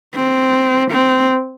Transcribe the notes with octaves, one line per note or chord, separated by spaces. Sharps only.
C4
C4